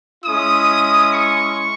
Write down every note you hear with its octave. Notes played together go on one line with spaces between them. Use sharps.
G#3 C#4 E4 D#6
C#6